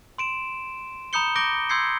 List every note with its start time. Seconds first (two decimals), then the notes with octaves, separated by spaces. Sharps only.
0.18 C6 D7 E7
1.13 A#5 B5 D#6 G6 C#7 G7
1.36 D6 G6 A#6 D7 G7
1.70 C6 E6 G6 G#6 C7 C#7